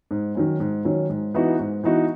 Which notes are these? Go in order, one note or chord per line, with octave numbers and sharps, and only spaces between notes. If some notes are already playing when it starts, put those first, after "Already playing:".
G#2
D#3 F#3 C#4
G#2
D#3 F#3 C#4
G#2
E3 B3 D#4 F#4
G#2
E3 B3 D#4 F#4